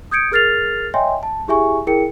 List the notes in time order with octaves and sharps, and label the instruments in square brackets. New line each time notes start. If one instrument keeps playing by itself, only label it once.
[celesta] D#6 G6 G#6 C#7 D7
G#4 A#4 F6 A6 C7 F7
C#5 D#5 E5 G5 G#5 C6
A5
E4 G4 G#4 E5 G#5 C#6
E4 G#4 A#4 G5 C#7